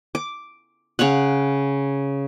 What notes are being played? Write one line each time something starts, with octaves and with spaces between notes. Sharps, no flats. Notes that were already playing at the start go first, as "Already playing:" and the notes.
D6
C#3 C#5 F5 F#5